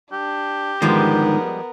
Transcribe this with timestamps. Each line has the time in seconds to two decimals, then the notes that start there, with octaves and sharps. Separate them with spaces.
0.12 D4 G4
0.82 G#2 D3 D#3 F3 G3 G#3 B3 A#4